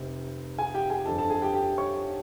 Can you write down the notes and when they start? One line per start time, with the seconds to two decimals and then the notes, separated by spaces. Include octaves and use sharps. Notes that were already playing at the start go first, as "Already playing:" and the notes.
Already playing: F1 C3
0.58 G#4 G#5
0.74 G4 G5
0.90 G#4 G#5
1.06 G1 F2 D3 A4 A5
1.18 A4 A5
1.30 G#4 G#5
1.42 G4 G5
1.53 G4 G5
1.78 C#5 C#6